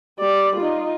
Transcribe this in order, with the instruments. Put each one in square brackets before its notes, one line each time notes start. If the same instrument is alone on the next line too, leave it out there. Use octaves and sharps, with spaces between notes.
[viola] G3 D5
D#4 F4